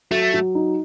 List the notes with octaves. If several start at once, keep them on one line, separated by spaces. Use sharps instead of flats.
F#3 A3
F#3
D#4